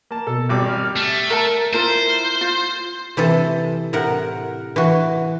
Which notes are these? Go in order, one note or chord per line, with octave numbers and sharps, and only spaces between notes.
A#3 A5
B2 A4
G#1 G3 D6
F6
A3
A#4 A5
E4 F4 A#4 C5
F4
C3 E3 A4
A2 C3 A#4 F#5
E3 F#4